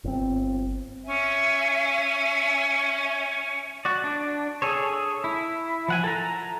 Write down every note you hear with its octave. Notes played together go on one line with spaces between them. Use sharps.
G1 C4
C#4 E5 G#5
F#4 D5
D4
G#4 A4 C#5
E4
F3 F#5 G#5
A4 A#5